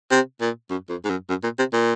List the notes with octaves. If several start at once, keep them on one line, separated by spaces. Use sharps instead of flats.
C3
A#2
F#2
F2
G#2
F#2
F#2
A#2
C3
A#2